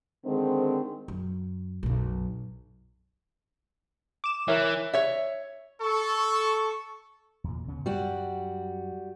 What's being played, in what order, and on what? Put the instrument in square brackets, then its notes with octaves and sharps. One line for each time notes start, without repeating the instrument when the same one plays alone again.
[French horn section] D3 D#3 G#3 C4
[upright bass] F#2
B1 F#2
[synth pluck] D6 E7
[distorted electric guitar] E3 [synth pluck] A#4 C#5 E5
[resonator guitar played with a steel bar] C#5 E5
[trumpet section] A4 [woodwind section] C#6
[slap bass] E2 A#2
D#2 C#3 B3
[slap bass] F#2 [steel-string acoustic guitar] G3 F#4